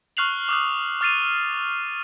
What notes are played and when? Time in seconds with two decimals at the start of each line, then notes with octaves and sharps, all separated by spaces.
0.17 C#6 F6 F#6 C7 F7 F#7
0.49 D6 D#6 F#6
1.01 D6 F6 A6 C7 D#7 F7